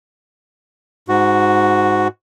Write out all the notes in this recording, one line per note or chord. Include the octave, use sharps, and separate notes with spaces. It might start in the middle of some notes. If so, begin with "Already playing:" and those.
G#2 F#4